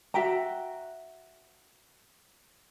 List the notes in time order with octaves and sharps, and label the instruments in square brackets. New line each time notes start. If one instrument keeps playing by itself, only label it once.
[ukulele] F#4 E5 G5 A#5